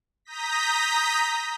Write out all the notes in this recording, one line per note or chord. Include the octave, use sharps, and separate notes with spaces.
A#5 D#6 G6 A#6 B6